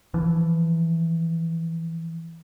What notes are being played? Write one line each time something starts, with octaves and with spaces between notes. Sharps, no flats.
E3 F3